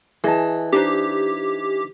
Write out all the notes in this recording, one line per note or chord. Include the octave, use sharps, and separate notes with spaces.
E3 G#4 D#5 A5
D4 D#4 G4 C5